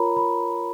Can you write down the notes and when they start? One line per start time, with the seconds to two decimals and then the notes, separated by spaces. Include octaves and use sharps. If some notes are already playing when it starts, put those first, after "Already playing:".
Already playing: F4 A#4 C#5 A#5 B5
0.16 B5